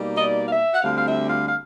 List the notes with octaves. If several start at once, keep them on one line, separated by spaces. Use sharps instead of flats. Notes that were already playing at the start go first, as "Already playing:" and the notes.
Already playing: B2 G3 A#3 D#4
D#5
D5
F5
E5
F#5
D2 D3 G3 C4 F5
F5
E5
F5
F5